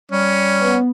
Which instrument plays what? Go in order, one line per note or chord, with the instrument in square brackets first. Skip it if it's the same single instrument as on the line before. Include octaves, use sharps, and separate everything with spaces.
[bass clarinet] G3 [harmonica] C#4
[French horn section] B3